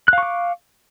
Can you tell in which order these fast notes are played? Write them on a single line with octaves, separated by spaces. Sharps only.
F#6 F5 C#6 D6